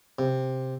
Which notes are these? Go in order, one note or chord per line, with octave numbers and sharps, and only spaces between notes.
C3